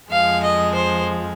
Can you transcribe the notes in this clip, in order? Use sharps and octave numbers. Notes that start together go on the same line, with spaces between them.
F2 F3 G#3 F5
D#5
C5